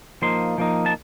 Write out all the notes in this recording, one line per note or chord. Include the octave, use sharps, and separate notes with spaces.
F3 A#3 D#4 C6
F3 A#3 D#4
A5